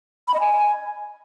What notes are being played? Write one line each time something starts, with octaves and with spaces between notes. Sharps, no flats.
B5
D#5
G#5